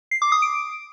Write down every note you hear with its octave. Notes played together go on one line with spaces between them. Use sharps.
C7
D6
D#6
D7